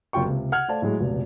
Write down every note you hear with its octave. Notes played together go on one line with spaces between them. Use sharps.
F#1 C3 F4 G5 C#6
C#2 C3
F#5 F6 G#6
A3 C5 D5 F5 A5
A2 F#3 G#3
F1 C#2 B2